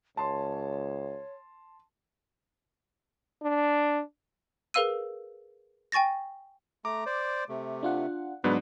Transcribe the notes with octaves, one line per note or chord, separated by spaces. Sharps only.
C#2 C#5 A5 C6
D4
G#4 A#4 B4 F5 E6 D#7
G5 G#5 C#6 A6 A#6
A3 A#5 D6
C5 D5
C3 A3
D4 F4 F#5
G#2 C#3 F#3 B3 D4 B4